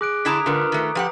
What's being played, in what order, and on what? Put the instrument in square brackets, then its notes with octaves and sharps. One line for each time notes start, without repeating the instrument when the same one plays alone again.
[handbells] G#4 [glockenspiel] D6 F#6 D7
[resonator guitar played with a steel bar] D3 E4 A5 [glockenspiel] A#5 D#6 B6
[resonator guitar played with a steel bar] G#2 D3 [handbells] F4 A#4 B4
[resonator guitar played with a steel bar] D#3 A3
[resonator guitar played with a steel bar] F3 G4 F#5 [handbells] B4